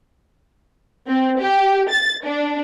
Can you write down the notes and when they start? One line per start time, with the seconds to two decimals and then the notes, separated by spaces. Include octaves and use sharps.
1.08 C4
1.41 G4
1.91 A6
2.26 D4